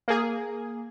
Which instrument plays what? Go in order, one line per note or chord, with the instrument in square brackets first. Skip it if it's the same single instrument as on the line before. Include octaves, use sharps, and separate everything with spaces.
[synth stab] A#3 G#4